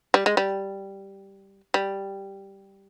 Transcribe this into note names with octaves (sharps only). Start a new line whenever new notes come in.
G3
G#3
G3
G3